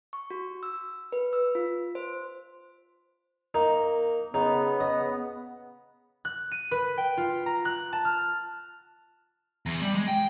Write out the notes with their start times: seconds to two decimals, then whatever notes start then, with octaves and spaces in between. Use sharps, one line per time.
0.13 C#6
0.30 F#4
0.63 E6
1.12 B4
1.33 E6
1.55 F4
1.95 C5
3.54 A#3 D#4
4.34 C#3 B3 D#4
4.80 C#3 D#5
6.25 F#6
6.52 D#7
6.71 B4
6.98 G5
7.17 F4
7.46 A#5
7.65 F#6
7.93 A5
8.05 F6
9.66 E2
9.82 G3
9.95 G#3
10.08 G5